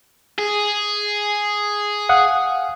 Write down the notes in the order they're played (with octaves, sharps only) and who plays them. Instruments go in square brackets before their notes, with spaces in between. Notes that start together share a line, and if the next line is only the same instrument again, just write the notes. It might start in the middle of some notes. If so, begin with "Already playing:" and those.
[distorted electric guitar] G#4
[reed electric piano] F5 F#5 D#6